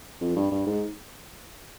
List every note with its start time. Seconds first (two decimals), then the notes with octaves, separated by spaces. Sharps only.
0.21 F2
0.36 G2
0.51 G2
0.66 G#2